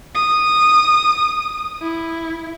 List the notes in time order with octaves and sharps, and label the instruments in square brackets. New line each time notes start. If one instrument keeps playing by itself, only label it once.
[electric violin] D#6
E4